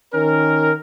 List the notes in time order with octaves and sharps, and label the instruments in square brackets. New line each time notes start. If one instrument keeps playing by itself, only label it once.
[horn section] D#3 C#4 A#4